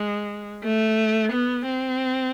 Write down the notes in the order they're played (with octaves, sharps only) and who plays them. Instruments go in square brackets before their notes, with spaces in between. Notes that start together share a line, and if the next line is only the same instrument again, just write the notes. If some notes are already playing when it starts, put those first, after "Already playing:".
Already playing: [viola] G#3
A3
B3
C4